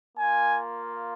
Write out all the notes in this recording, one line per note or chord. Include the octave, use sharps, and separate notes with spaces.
A#3 F4 G#5